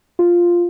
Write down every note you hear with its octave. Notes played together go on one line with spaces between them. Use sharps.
F4